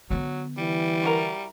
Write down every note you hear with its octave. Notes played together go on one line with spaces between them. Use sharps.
D3 F#3 B3
E3 G3
E4 F#4 A#4